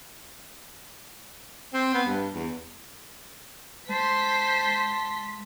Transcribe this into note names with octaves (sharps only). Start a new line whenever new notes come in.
C4
B3
G2
E2
G#3 C5 A5 C6 B6